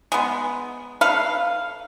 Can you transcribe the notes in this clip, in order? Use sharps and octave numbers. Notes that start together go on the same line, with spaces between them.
G#3 B3
A4 B4 F5